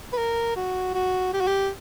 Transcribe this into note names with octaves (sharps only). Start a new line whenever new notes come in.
B4
A#4
F#4
F#4
G4
F#4
G4